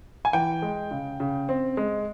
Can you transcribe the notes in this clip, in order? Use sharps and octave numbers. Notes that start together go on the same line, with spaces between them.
G#5
E3 G5
G#3
C#3
C#3
C4
G#3